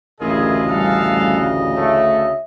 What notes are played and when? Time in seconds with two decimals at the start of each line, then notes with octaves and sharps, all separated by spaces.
0.20 A1 D2 C#3 E4 F4 G#4 A#4 D#5
0.69 G3 B3 A4 F5 G#5
1.76 A3 C#5 E5